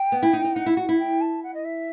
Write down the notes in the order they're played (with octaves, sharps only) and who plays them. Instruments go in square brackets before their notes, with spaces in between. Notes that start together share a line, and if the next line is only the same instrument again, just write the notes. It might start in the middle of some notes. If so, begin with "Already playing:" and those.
Already playing: [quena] G5
[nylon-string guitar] B3
E4
D#4
D#4
[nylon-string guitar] D#4 [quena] F#5
[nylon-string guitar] E4
F#4
E4
[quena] G5
A5
F#5
D#5
E5